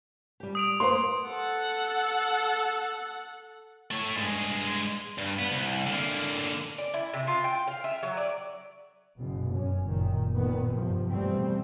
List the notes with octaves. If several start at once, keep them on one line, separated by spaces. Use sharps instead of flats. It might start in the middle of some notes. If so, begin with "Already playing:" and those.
G3 G4
D#6 D7 F7
A#3 B4 C5 C6
A4 F#5
A3 C#5
G2 G#3
G2
B3
C2
D3 A#3
D5
E4
C3
F4
G5
F5
E5
F#3
D5
F#1 B2
F#2 C#4
F#1 A#2 D#3
A#2 D#3 B3
G2 C3 F3
E2 B2 G3 A3 C4